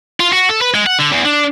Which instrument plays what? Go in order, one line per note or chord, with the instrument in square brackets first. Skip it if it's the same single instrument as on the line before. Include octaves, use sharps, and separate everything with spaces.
[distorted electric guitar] F4
F#4
A4
B4
G#3
F#5
D3
E2
D4